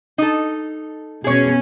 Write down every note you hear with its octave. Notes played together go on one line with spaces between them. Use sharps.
D#4 A4
B2 C#4 G#4 C#5